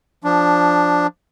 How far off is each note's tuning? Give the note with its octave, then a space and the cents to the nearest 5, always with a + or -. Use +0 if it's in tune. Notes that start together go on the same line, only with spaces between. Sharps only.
F3 +0 D4 +0